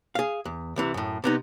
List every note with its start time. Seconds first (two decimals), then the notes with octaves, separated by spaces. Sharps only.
0.15 G#4 F5
0.45 E2
0.76 C2 C3 E3
0.94 F#2 A2
1.24 C3 B3 D#4